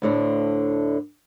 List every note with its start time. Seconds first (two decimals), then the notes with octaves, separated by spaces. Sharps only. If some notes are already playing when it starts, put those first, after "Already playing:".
0.02 D2 A2 D3